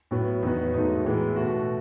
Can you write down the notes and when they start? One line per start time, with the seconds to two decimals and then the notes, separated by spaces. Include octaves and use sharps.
0.11 A2 F#3 B3
0.42 E2 D#3 F#3 B3 D#4
0.74 G#2 F#3 A3 D#4
1.05 A2 E3 G#3 B3
1.36 B2 A3 F#4